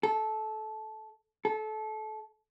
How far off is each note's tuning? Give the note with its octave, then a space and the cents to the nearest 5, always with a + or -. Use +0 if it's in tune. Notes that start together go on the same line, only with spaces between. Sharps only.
A4 -15
A4 -25